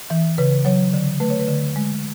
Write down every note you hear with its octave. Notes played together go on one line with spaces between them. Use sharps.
E3 E5
C#3 B4
F#3 C#5
D3
A3 B4
C#5
B4
D3
G#3